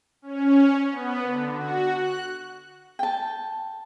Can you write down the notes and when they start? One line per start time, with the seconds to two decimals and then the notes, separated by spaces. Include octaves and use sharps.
0.22 C#4
0.91 B3
1.23 D3
1.52 F#4
1.97 F#6
2.99 G5 A5